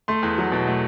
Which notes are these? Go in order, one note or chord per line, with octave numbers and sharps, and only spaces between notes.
A3 C6
E2
F#3
B2
A3